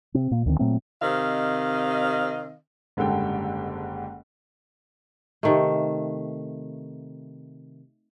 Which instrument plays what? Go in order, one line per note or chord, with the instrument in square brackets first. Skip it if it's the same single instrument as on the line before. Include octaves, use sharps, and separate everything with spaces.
[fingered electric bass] C3 C4
A#2 A#3
D2 D#3 C4
A#2 F#3 A3 C4
[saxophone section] C3 D#3 C4 D#5 F5
[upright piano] F#1 G#2 D3 G3 A4 G5
[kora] C3 D#3 A3